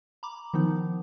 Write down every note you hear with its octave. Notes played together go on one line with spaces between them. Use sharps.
A#5 B5 D6
D#3 F3 B3 D#4